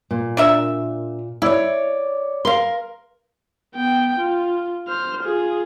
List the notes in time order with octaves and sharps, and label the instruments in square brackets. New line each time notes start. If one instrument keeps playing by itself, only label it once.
[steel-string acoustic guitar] A#2
[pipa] D4 A#4 E5
[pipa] E4 [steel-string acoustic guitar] C#5 D5
[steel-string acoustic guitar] A#4 [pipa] F5 C6
[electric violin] B3 G5
F4
C5 F6
F4 G#4